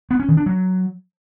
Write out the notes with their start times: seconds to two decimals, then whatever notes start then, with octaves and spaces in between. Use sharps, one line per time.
0.11 B3
0.20 C#4
0.28 D#3
0.37 D4
0.46 F#3